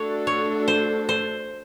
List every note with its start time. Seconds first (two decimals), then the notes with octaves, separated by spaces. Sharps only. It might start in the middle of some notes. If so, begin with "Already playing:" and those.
Already playing: A3 D4 F#4 A4 C#5
0.27 C#5
0.68 C5
1.09 C5